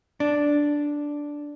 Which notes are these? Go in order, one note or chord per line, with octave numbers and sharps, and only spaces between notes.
D4